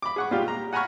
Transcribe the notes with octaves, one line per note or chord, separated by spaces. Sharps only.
B5 D6
G#4 F#5 C#6
A#2 G3 G#3 F4 G4
A#5
F#5 G#5 A#5 B5 C#6 F6